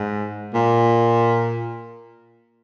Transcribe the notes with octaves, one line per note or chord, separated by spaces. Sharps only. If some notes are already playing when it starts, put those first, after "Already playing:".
Already playing: G#2
A#2